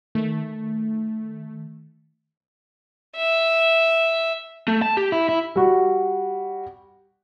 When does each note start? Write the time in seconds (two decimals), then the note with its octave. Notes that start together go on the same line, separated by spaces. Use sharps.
0.15 D#3 A3
3.17 E5
4.68 A3
4.82 A5
4.97 G4
5.12 E4
5.29 E4
5.56 G3 F#4